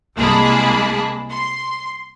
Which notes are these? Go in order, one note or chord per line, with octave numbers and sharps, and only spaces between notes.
C2 G#3 A#3 G#4 A5 B5
C6